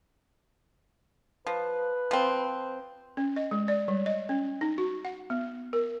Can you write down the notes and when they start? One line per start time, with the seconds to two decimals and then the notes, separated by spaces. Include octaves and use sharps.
1.47 F3 B4
2.11 F3 C4
3.17 C#4
3.36 D#5
3.51 G#3
3.68 D5
3.88 G3
4.06 D#5
4.29 C#4
4.61 D#4
4.78 F#4
5.05 F#5
5.30 B3
5.73 A#4